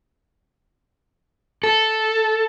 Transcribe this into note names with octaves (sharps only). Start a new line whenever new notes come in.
A4